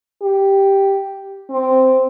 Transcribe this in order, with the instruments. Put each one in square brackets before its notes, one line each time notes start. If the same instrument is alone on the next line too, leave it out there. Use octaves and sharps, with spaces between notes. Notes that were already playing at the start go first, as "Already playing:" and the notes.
[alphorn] G4
C4